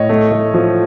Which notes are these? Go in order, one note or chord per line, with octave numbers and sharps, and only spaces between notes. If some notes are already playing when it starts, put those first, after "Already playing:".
Already playing: A2 C#5 D#5
A3
A3
F3